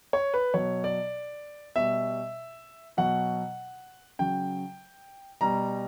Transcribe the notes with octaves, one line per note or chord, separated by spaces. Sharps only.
C#5
B4
B2 F#3 C#5
D5
B2 G3 E5
B2 F#3 F#5
C#3 F#3 G5
B2 G3 A#5